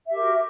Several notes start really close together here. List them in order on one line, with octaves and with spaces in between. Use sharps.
E5 G4 A#4 F#4